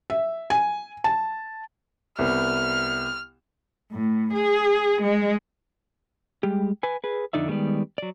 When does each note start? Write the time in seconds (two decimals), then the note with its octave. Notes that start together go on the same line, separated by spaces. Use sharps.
0.10 E5
0.50 G#5
1.04 A5
2.19 C2 B3 F6
3.92 A2
4.34 G#4
5.02 G#3
6.43 G3 G#3 G4
6.83 B4 G#5
7.04 G#4 B4
7.33 F2 D3 D#4 D5 E5
7.48 D#3 G3 G#3 B3 D5
7.98 F#3 D5